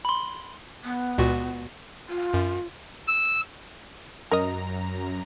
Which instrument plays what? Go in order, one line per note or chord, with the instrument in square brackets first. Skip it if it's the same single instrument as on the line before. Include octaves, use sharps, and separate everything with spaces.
[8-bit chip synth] B5 C6
[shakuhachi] B3
[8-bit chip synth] C#2 A#2 F#4
[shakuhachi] F4
[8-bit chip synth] F#2
[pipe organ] E6
[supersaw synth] F#2 A#5 [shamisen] A#4 D#5